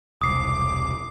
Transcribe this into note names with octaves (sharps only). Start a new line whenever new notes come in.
E1 C2 D6 D#6 C7